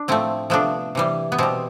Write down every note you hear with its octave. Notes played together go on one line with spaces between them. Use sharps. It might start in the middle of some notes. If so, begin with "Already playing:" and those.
Already playing: D4
A2 F3 A3 C4
C3 F3 A3 B3 D4
C3 E3 G3
B3
B2 G3 C4